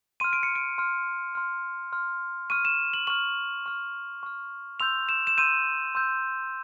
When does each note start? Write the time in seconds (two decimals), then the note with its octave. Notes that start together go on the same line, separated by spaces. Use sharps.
0.20 C6 F6 D#7
0.33 D7
0.43 C#7
0.55 D7
0.78 C6 F6
1.35 C6 F6
1.92 C6 F6
2.50 C#6 F6 D#7
2.65 E7
2.94 F#7
3.07 C#6 F6 F#7
3.66 C#6 F6
4.23 C#6 F6
4.80 C6 E6 G6 F7
5.09 E7
5.27 E7
5.37 C6 E6 G6 D#7
5.95 C6 E6 G6